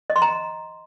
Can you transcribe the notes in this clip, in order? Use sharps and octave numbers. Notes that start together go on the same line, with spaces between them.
D#5
C6
A#5